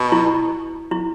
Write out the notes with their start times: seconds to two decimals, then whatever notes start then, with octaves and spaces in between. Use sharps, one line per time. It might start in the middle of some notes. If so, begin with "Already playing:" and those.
Already playing: B2
0.12 E4
0.91 E4